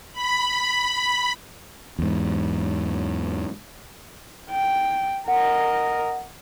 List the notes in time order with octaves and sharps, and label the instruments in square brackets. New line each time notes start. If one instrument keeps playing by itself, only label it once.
[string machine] B5
[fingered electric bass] E2 G#2
[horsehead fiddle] G5
[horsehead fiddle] A#4 D#5 [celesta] F#5